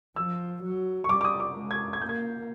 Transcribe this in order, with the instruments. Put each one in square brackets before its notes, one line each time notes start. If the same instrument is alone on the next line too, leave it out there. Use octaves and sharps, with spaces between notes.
[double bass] F3 [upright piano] E6
[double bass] F#3
[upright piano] C#6
[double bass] G3 [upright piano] D6
[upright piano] D6
D#6
D6
[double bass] G#3
[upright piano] G#6
G#6
[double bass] A#3 [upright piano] G6
[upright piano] G#6